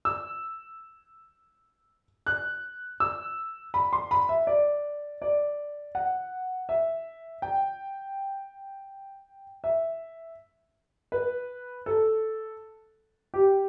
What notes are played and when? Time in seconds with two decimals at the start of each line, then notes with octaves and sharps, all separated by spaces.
0.05 E6
2.26 F#6
3.00 E6
3.74 B5
3.93 C6
4.11 B5
4.29 E5
4.47 D5
5.22 D5
5.95 F#5
6.69 E5
7.42 G5
9.64 E5
11.12 B4
11.86 A4
13.34 G4